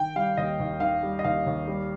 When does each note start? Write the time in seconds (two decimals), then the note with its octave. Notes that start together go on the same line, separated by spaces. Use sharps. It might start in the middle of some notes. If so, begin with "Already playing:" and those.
Already playing: D#3 G5
0.16 G3 F5
0.37 D#2 D#5
0.60 D#2
0.80 D#3 F5
1.03 G3
1.19 D#5
1.24 D#2 F5
1.46 D#2
1.67 G3